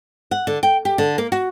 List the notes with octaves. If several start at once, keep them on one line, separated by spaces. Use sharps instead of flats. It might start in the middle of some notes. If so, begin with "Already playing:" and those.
F#5
D3
G5
G4
D3
A#3
F#4